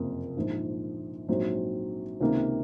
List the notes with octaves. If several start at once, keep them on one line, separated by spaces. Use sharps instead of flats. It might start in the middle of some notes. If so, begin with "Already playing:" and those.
Already playing: F#1 F2 C3 A#3
A#1 G#2 F3
A#1 G#2 F#3 C4
C#2 C3 D#3 A#3